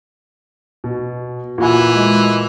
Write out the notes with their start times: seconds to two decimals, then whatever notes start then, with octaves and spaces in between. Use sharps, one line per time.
0.84 B2
1.58 A#2 E3 F#4 G#5
1.94 G#3